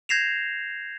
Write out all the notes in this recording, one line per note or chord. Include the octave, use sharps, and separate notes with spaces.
G6 G#6 A#6 C7 E7 F7